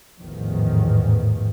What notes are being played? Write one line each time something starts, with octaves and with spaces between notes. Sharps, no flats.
A1 E2 G#2 D#3 F3